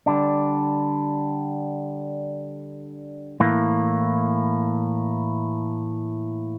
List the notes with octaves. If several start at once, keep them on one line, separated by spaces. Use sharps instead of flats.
D3 G3 D4
A2 E3 A#3